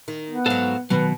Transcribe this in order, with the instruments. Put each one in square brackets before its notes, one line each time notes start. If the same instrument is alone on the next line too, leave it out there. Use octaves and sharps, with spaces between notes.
[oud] D#3
[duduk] B3
[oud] G#2 F#3 [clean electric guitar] A4 C5 F5
[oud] B2 [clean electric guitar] D#3 E3 F#3 [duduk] B4